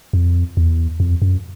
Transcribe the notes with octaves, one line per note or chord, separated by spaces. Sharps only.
F2
E2
F2
F#2